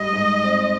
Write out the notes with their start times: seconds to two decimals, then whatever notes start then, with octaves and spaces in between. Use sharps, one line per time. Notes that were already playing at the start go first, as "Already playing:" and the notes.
Already playing: G#2 G3 D#5
0.13 G#2
0.43 C4